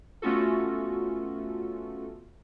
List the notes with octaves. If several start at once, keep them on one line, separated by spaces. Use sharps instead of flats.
A3 B3 C#4 F4 F#4 A4